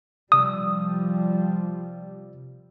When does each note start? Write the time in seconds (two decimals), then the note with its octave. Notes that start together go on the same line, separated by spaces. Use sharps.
0.32 C3 F3 G3 D5 D#6 E6